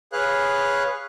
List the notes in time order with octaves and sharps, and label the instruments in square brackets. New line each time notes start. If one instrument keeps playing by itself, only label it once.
[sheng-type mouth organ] G#4 B4 C#5 F5 F#6